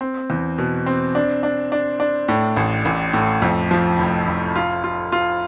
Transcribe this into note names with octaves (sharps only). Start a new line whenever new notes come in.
C4
E2
B2
C4
D4
D4
D4
D4
A2
A1
A1
A2
F2
F3
F1
F1
F4
F4
F4